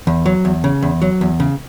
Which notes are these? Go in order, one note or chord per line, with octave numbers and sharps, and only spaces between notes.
E2
F#3
E2
C#3
E2
F#3
E2
C#3